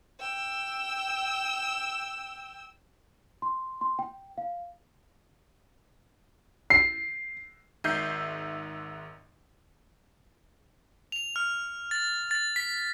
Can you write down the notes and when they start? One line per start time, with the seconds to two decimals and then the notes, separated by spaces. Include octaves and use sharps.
0.20 G5 E6
3.42 C6
3.81 C6
3.99 G5
4.38 F5
6.70 C7
7.84 G#1 G#2 E5 G6 C7
11.12 F7
11.36 F6
11.91 A6
12.31 A6
12.56 B6